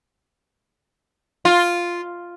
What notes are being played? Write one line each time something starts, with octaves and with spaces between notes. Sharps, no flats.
F4